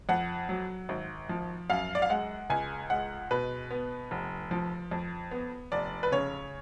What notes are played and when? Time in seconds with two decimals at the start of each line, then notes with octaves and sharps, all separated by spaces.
0.09 F2 F#5
0.49 F#3
0.89 G#1
1.29 F3
1.70 F#2 F5
1.95 D5
2.02 F5
2.10 G#3 F#5
2.50 C#2 G#5
2.90 G#3 F#5
3.31 B2 B4
3.70 B3
4.11 F1
4.51 F3
4.91 F2
5.31 B3
5.72 F1 D5
6.03 B4
6.12 C#3 C#5